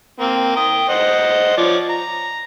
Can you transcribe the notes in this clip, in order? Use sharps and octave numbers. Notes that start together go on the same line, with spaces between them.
A#3 C4
G5 D#6
C5 D#5 F#5
F3 C#5 D5
A#5